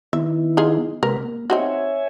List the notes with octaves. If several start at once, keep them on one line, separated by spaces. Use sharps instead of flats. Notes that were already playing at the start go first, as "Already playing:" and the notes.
D#3 B3 E4 E5
D#4 F4 G#4
C3 G#3 A#4 B4
A#3
C4 D#4 F#4 C#5 E5 G#5